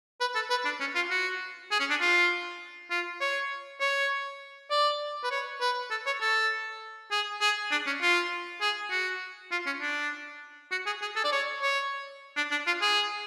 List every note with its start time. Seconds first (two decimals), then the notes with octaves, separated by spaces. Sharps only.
0.20 B4
0.35 A4
0.50 B4
0.65 D4
0.80 C#4
0.95 F4
1.11 F#4
1.71 G#4
1.80 C#4
1.90 D4
2.01 F4
2.91 F4
3.20 C#5
3.80 C#5
4.70 D5
5.24 B4
5.31 C#5
5.61 B4
5.91 A4
6.06 C#5
6.21 A4
7.11 G#4
7.41 G#4
7.71 D4
7.86 C#4
8.02 F4
8.61 G#4
8.91 F#4
9.52 F4
9.66 C#4
9.81 D4
10.72 F#4
10.86 G#4
11.02 G#4
11.16 A4
11.24 D5
11.32 C#5
11.62 C#5
12.37 D4
12.51 D4
12.67 F4
12.82 G#4